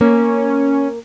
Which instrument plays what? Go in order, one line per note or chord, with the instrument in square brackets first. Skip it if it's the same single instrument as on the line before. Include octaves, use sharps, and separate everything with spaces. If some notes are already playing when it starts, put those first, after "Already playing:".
[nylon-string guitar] A#3 [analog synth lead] C#4